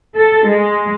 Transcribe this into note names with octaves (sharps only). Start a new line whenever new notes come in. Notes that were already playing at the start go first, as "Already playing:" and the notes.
A4
G#3